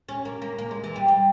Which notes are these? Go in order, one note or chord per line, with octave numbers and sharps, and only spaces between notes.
C#4
A#3
A#3
A#3
G#3
E3
G3
G3